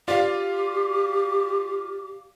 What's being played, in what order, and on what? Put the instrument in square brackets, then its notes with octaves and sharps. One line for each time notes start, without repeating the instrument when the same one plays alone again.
[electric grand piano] F4 [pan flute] G4 [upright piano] D5 F5